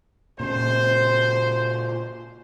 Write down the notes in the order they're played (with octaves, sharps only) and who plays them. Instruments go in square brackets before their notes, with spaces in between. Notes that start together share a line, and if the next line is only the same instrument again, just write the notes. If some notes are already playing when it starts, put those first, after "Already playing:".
[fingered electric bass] A#2 C#3 [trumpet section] C5